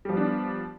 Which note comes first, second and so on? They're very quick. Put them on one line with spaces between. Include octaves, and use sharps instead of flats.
G3 F3 B3 D4